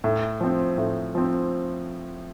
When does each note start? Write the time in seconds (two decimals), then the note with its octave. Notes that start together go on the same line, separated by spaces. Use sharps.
0.04 A2
0.41 F3 C4
0.78 A2
1.15 F3 C4